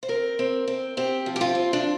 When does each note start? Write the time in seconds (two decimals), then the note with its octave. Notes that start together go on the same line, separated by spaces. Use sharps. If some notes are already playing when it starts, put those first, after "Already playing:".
0.03 C5
0.08 C4 A#4
0.39 C4
0.67 C4
0.97 C4 G4
1.26 F3
1.36 G4
1.41 F4
1.55 C4
1.73 D4